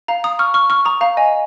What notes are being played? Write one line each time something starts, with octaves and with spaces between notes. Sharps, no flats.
F5 A#5
A#5 D#6
C#6 F6
C#6 F6
C#6 F6
A#5 D#6
F5 A#5
D#5 G#5